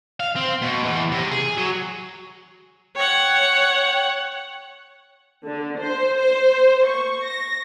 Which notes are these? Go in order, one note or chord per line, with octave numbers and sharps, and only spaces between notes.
F5
C4
B2
E2
C3
G#4
F#3
C#5 F#5 G5
D3
C5
C5
C#6
A#6